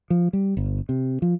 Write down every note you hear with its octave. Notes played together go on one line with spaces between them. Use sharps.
F3
G3
G1
C3
F3